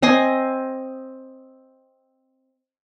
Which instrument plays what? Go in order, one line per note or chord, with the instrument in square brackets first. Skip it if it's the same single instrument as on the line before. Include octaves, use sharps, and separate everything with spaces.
[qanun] C4 D#5 G#5 C6